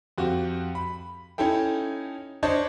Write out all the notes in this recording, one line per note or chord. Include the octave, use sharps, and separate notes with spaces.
F2 F#4 G4
B5
C#4 D#4 E4 A4 G5
D4 C5 C#5 D#5 A5